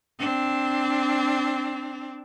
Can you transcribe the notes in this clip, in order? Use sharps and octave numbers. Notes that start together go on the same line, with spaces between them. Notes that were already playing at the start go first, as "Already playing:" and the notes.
C4 D4